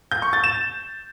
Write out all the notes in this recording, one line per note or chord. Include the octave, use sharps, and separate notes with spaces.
G6
C#6
A6
E7